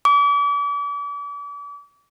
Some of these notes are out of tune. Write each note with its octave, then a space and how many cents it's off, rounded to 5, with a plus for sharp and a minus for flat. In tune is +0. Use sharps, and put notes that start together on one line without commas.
D6 -40